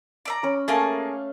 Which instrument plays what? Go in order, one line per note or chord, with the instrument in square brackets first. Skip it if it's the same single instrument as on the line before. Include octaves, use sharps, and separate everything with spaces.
[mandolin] D5 E5 A#5
[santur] C#4 B5
[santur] A3 F5 C#6 [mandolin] A#3 G#4 A5